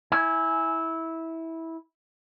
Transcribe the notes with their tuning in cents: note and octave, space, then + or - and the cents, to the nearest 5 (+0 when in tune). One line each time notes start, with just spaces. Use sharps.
E4 -15 G#5 +0